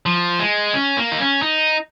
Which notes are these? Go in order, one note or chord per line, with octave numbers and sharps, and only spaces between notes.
F3
G#3
C#4
A#3
D#4
C#4
D#4